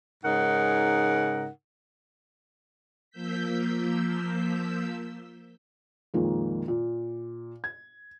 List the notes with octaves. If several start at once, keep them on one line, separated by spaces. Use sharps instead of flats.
G#2 C#3 D#4 A#4 F#5
F3 A#3 E6 G6 B6
F2 A#2 D#3 G#3 A#3
A#2
G#6